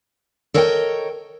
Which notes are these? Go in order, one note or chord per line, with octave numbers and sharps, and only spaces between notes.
A4 A#4 C#5 D#5 F5 G5